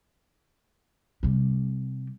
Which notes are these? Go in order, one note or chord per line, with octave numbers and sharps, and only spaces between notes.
C3 G3